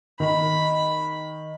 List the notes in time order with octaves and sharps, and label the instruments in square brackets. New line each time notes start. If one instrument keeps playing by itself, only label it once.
[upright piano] D#3 [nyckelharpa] B5